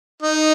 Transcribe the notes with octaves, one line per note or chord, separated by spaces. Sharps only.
D#4